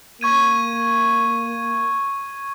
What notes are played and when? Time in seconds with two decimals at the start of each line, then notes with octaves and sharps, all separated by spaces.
0.21 A#3 C#6 G#6 D#7